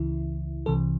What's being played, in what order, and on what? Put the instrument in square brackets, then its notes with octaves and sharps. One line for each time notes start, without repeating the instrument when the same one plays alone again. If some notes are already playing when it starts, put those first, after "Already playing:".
Already playing: [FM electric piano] C#2 C#3 E3 E4
C2 C3 E3 A4